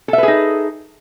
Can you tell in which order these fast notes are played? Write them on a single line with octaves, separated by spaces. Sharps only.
A4 E5 B4 G#4 D#4